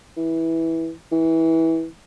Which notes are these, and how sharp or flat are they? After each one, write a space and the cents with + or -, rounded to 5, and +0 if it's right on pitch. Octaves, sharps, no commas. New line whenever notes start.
E3 -15
E3 -20